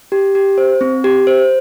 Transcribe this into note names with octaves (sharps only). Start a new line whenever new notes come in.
G4
G4
C5
C4
G4
C5